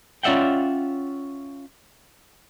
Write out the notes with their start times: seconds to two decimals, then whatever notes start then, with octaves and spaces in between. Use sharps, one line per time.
0.23 C#4 F4 D5 E5 F#5 G5